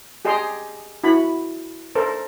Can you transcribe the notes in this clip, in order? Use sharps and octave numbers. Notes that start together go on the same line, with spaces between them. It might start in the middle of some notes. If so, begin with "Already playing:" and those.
G4 G#4 D#5 G5 A#5 C6
E4 F#4 B5
A4 A#4 C5